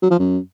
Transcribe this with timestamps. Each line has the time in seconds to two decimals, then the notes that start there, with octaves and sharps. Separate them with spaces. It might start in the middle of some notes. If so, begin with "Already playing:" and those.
0.02 F#3
0.11 F3
0.19 F#2